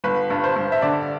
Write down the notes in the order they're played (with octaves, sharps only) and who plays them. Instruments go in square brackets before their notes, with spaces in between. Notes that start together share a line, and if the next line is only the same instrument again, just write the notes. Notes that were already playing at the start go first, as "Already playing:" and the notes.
[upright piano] G1 B4
G2
C5
G2
E5
D3 D5